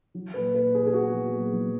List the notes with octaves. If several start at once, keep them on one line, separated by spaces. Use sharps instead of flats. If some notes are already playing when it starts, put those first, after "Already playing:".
F#3
A#2 B4
A#2 B4
A#2 G#4
G#4
B3 F#4
F#3
A#2
F#3